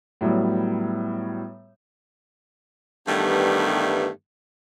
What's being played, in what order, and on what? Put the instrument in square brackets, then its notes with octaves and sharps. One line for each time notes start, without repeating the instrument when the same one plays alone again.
[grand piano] A2 F#3 G3 B3
[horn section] G2 D#3 E3 G3 A3 B3